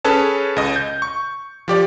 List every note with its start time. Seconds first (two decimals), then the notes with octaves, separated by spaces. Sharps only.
0.05 C#4 G#4 A4 B4 C#5 A5
0.56 C#2 D#5
0.76 G6
1.02 C#6
1.68 F3 G4 D5